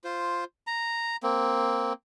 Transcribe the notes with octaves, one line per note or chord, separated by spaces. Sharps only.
F4 C5
A#5
A#3 C4